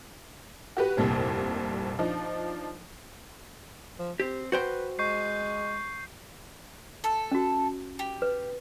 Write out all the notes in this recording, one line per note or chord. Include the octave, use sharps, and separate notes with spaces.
F#4 G4 B4
F1 C2 G2 A#2 C4
F3 D4 D#4
F3
C4 G4
F#4 B4 C5 G5
G#3 C#6 G6 C7
A4
C#4 F#4
G4
B4